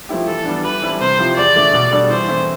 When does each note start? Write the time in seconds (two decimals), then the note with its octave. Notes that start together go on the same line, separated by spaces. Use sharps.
0.09 F3 A3 E4 G4
0.27 E3 A4
0.45 G3 B3 D4
0.64 E3 B4
0.82 G3 C4 E4 A4
1.01 C3 C5
1.19 F3 C4 E4 G4
1.37 E2 D5
1.56 D3 A3
1.74 B2
1.91 G3 D4 A4 D5
2.10 E3 C5
2.29 A3 C4 E4